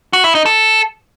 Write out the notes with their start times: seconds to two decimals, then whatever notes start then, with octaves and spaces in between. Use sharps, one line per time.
0.13 F#4
0.24 E4
0.35 D#4
0.46 A4